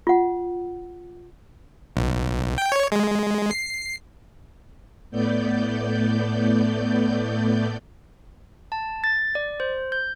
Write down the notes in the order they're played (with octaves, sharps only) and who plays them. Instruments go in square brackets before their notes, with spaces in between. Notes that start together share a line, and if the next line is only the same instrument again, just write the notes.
[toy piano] F4 F#5
[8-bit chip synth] B1
G5
C#5
G#3
C7
[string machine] A2 A3 B3 D5 G6
[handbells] A5
A6
D5
C5
G6